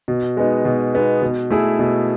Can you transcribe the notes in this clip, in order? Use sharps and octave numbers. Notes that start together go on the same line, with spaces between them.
B2
G#3 B3 D#4
B2
G#3 B3 D#4
B2
A3 E4 G#4
B2